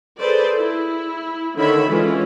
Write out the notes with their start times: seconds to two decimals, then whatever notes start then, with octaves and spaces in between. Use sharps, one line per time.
0.18 G#4 A4 B4 C5 D5
0.59 E4
1.57 D3 D#3 C#5 E5 B5
1.89 E3 G#3 C#4 F4